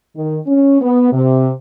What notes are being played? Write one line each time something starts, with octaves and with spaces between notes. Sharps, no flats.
D#3
C#4
B3
C3